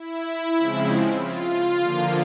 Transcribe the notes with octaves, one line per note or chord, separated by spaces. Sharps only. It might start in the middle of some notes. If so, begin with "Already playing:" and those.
Already playing: E4
C#3 F3 G#3 C4
F4
D3 F3 A#3